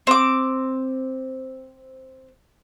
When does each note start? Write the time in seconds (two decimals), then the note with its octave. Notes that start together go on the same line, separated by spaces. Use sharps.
0.07 C4 D6